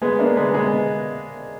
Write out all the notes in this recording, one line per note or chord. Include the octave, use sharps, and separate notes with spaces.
G#3 B3
A#3 D4
G#3 B3
G#3 B3